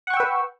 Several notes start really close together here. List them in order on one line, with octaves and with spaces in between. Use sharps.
F#5 C#6 G5 E6 B4